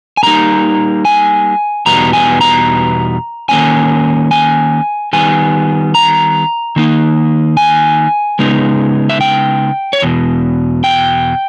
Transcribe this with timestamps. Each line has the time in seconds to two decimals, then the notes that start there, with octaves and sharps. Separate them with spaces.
0.17 G#5
0.23 C#3 G3 A#3 D#4 A#5
1.05 G#5
1.86 E2 B2 G3 B3 D#4 A#5
2.13 G#5
2.41 A#5
3.49 D#3 A#3 C#4 G#5
4.31 G#5
5.13 D#3 G3 B3 G#5
5.95 A#5
6.76 D#3 A#3 D#4
7.57 G#5
8.39 C#3 G#3 B3 D#4
9.10 E5
9.21 G5
9.93 C#5
10.02 E2 B2
10.84 G5